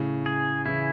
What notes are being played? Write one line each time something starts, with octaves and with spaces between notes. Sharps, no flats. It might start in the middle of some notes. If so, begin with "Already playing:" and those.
Already playing: A2 C#3
G#4
C#3 E3 E4